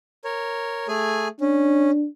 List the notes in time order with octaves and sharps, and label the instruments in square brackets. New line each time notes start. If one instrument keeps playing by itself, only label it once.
[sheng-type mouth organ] A#4 C#5
A3 G#4 G#5
[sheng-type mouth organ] C#4 [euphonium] D4